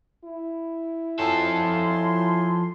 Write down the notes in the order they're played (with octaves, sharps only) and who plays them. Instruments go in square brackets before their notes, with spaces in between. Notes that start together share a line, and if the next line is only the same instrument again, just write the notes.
[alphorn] E4
[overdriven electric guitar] F3 A4 [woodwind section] F#3 G#5 C6